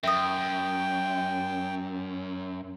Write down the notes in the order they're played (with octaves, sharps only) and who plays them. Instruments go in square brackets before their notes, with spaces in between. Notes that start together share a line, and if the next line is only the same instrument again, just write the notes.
[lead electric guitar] F#2 [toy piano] E5 D#6 [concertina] G5